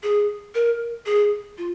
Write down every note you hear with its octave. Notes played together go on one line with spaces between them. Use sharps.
G#4
A#4
G#4
F4